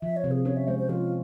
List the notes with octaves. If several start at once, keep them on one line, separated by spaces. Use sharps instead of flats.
F3 E5
C#5
C3
G#4
C#4 C#5
E5
G#3 C5
C5
F3 F4